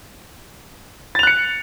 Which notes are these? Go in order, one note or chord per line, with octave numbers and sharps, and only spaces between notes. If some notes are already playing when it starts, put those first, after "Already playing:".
F#6 A6 C#7 F7